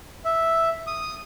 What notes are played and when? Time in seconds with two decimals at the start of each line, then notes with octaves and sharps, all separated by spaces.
0.25 E5
0.87 D#6